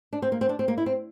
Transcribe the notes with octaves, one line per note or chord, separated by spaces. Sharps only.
D4
C4
A#3
C4
D4
C4
A#3
E4
C4